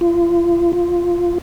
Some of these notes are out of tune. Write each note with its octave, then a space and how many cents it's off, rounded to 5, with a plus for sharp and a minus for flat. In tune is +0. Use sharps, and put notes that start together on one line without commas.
F4 -35
F4 -5